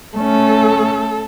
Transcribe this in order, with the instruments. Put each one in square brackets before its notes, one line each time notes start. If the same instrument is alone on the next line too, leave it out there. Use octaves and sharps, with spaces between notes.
[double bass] A3 C#4 [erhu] A4